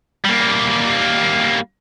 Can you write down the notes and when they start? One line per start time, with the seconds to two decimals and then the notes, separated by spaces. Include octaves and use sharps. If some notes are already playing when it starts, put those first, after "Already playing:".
0.25 G3 A#3